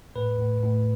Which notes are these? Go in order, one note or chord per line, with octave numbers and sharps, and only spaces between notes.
A2 B4
A2
A2